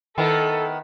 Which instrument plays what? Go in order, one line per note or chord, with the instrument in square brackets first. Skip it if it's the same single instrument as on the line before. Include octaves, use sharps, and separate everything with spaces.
[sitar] D#3 B3 E4 [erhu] A4